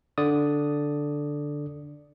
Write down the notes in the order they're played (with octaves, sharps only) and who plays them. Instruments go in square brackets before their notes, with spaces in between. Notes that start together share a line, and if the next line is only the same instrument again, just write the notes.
[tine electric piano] D3 D5 D#6